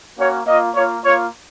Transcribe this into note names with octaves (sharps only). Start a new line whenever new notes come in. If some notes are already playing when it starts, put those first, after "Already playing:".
A#3 C#4 F#4 C#5
A#3 F4 D#5
A#3 F4 C#5
A#3 F4 C#5